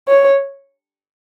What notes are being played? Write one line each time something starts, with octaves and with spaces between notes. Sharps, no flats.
C#5